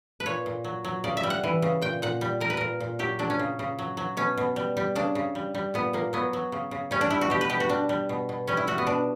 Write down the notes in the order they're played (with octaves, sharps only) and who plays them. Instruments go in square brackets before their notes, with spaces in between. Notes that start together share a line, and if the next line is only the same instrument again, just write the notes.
[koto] B4
A#2 C#5
A#2
F#3
F#3
C#3 D5
E5
G3
F#5
E3
C#3
A#2 G5
A#2 F#5
G3
G3 A#4
B4
A#2 A#4
A#2
F#3 G4
F#3 D4
C#4
C#3
C#3
F#3
F#3
B2 C#4
B2
G3
G3
C#3 D4
C#3
G3
G3
A#2 B3
A#2 A#3
F#3 B3
F#3
C#3
C#3
G3 C#4
D4
G3 E4
F#4
B2 G4
B4
B2 G4
F#4
G3 D4
G3
B2
B2
G3 C#4
E4
G3 F#4
B3
B2 D4